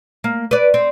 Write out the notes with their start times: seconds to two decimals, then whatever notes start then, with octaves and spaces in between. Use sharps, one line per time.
0.24 A#3
0.51 B4 D5
0.74 C4